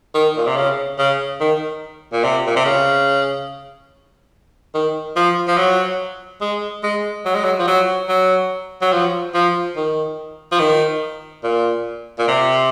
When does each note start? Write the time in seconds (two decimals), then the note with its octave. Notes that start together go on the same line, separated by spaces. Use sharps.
0.15 D#3
0.37 A#2
0.47 C3
0.56 C#3
0.99 C#3
1.40 D#3
2.13 A#2
2.24 C3
2.47 A#2
2.56 C3
2.65 C#3
4.74 D#3
5.16 F3
5.48 F3
5.58 F#3
6.41 G#3
6.84 G#3
7.26 F#3
7.35 G#3
7.44 F#3
7.59 F3
7.67 F#3
8.09 F#3
8.82 F#3
8.93 F3
9.34 F3
9.76 D#3
10.52 F3
10.60 D#3
11.44 A#2
12.19 A#2
12.28 C3